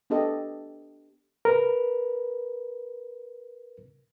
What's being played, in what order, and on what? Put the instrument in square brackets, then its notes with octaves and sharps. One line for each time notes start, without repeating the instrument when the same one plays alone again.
[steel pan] B3 D4 G4 A4 D#5
[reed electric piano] A#4 B4